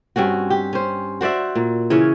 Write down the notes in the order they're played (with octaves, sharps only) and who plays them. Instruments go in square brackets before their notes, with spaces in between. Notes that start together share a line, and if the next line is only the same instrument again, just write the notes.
[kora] G2 C4 C#4 F#4
G4
C#4 C5
F#4 C5 D5 E5
A#2
C#3 E3 C#4 C#5